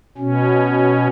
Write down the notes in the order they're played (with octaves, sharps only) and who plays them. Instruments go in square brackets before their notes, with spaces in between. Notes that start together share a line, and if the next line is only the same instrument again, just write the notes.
[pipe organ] B2 C#4